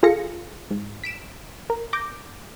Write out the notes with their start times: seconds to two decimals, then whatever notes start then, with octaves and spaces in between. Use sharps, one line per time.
0.03 F4 G#4 A4 F5 A#6 C#7
0.70 G#2
1.04 B6 D7 E7
1.70 A#4
1.93 D6 G6 A#6